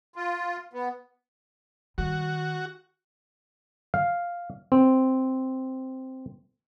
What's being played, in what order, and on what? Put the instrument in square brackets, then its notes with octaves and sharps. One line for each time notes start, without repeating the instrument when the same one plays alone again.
[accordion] F4
B3
[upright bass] D#3 G3 [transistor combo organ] F#4
[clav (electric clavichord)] F5
C4